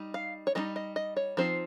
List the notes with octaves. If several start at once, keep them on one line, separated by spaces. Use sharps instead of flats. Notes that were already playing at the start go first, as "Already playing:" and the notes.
Already playing: G3 D#4
F5
C#5
G3 C4 D#4 D#5
D#5
D#5
C#5
F3 C4 D#4 C5